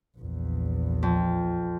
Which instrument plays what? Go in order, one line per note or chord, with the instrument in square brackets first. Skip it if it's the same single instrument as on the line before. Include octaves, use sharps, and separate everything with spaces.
[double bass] A#1 E2
[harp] F2